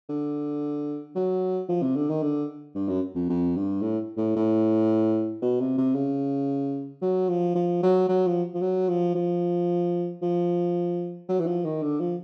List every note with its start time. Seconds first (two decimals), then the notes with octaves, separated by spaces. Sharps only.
0.09 D3
1.15 F#3
1.69 F3
1.82 C3
1.96 D3
2.09 D#3
2.22 D3
2.75 G2
2.88 F#2
3.15 F2
3.29 F2
3.56 G2
3.82 A2
4.17 A2
4.36 A2
5.42 B2
5.61 C3
5.78 C3
5.95 C#3
7.02 F#3
7.29 F3
7.55 F3
7.83 F#3
8.09 F#3
8.27 F3
8.54 F3
8.62 F#3
8.89 F3
9.15 F3
10.22 F3
11.29 F#3
11.40 E3
11.46 F3
11.65 D#3
11.82 D3
12.00 F3